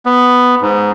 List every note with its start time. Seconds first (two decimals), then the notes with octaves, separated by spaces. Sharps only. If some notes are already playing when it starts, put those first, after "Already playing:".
0.06 B3
0.61 G#2